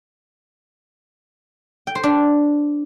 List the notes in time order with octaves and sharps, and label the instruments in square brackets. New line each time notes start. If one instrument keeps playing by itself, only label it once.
[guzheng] G5
C5
D4